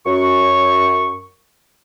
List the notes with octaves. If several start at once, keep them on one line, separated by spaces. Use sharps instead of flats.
F#2 C#6